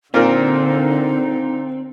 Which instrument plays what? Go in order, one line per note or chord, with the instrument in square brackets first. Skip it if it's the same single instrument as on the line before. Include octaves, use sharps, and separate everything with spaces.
[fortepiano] A#2 A#4 [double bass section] D3 [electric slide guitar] C4 [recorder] D#4